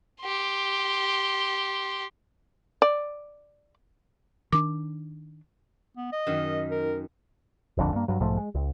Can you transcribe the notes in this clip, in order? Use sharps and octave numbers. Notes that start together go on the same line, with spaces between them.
G4 C6
D5
D#3 D4 D6
B3
D#5
F#2 D#3
A#4
D#1 A#1 F2 D3
G2 A#3
G2 F#3
B1 G#2 F3 A3
G#3
C#2